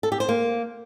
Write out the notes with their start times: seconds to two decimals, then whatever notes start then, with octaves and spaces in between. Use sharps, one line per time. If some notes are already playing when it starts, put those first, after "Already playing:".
0.03 A4
0.12 G4
0.20 C5
0.29 A#3